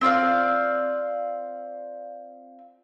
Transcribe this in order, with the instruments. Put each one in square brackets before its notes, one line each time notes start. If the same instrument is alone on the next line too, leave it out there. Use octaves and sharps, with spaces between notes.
[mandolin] C4 F4 D5 F5